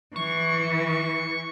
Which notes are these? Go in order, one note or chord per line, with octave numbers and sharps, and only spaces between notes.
E3 C#6